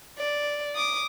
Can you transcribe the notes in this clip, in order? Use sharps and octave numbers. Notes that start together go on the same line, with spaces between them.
D5
D6 D#6